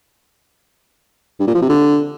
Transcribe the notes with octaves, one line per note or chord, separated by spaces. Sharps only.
G2
A#2
F3
C3
D3